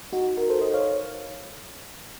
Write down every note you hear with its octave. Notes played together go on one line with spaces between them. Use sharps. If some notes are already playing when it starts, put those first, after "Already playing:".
D#4 F#4
F#4 A#4
A4 C5
C5 D#5
C#5 F5